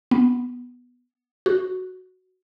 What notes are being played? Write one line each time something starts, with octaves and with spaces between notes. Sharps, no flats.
B3
F#4